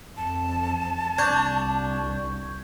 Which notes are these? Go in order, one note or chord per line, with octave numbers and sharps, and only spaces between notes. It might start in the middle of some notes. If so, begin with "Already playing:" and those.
F2 A5
C2 D4 C#6 G6 G#6